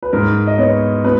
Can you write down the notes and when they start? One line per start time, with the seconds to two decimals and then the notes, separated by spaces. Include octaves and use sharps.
0.03 B4
0.13 G#2 A#4
0.47 D#5
0.58 B3 C#5
1.04 B3 B4